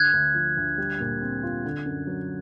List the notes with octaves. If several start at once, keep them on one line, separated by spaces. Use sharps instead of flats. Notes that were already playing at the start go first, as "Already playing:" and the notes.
Already playing: D3 F#6 G#6
D2
F3
D2
G3
A#2
C4
F4
D3
F#2
F#3